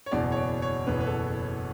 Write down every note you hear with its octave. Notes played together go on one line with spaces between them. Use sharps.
C#5
F#1 E2 B2 D5
C#5
D5
C#5
F#1 E2 B2 B4
B4
A4